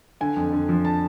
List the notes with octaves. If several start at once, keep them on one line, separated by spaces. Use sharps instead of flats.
D3 G#5
F2
D3
F3
A5